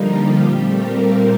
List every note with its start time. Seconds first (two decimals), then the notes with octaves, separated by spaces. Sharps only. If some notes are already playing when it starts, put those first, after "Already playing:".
Already playing: D3 F3 G3 A#3 D#4 F4
0.12 G3 G4
0.42 A#2 A3 C4
0.71 A#3 A#4